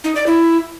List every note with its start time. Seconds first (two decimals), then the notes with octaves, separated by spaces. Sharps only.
0.04 D#4
0.15 D5
0.27 E4